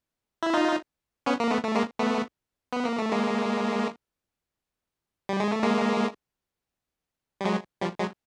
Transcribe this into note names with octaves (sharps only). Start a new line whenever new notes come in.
E4
D#4 F4
B3 C#4
A#3
A3 B3
A3
G#3 A#3
A3 B3
B3
A#3
A3
G#3 A#3
G3
G#3
A3
G#3 A#3
G3
F#3 G#3
F3 G3
F#3 G#3